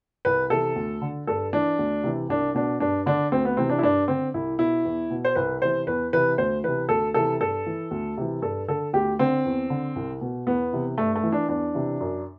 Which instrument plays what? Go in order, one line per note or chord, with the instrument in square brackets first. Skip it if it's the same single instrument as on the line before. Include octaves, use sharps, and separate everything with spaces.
[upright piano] C2 B4
C3 E3 A4
D2
D3
G2 A4
E3 D4
D2
C3 E3
C2 D4
B2 D4
G2 D4
D3 D4
D2 C4
B3
C3 E3 C4
D4
E4
G2 D4
D3 C4
C2 E4
B2 E4
E2
B2
C5
C2 B4
C3 E3 C5
E2 B4
C3 E3 B4
D2 C5
C3 E3 B4
D2 A4
C3 E3 A4
G2 A4
E3
D2
C3 E3
G2 A4
D3 A4
D2 G4
D3 C4
E2
D3
C2
B2
E2 B3
C3 E3
G2 A3
A3
E3
D4
E2 D4
C3 E3
F#2